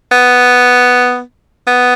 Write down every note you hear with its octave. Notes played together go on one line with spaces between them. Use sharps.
B3
B3